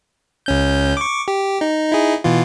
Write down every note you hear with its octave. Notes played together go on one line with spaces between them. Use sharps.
C#2 C#4 G6
C#6 D6
G4
D#4
D#4 E4 G#4
B2 E3 F4